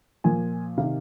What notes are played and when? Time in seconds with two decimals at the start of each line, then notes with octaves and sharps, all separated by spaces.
0.24 A#2 F3 G#5
0.78 C3 D#3 F5